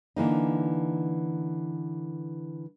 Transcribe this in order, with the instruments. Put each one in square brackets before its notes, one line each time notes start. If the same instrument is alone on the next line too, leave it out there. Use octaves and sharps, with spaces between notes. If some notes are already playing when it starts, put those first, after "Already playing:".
[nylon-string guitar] D3 E3 A#3 D#4